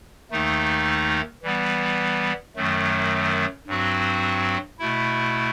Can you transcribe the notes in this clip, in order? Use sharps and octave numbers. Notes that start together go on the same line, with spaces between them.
D#2 D#3 A3 D#4
E3 G3 B3
F#2 D#3 F#3 A3
G2 F#3 C4 F#4
B2 A3 E4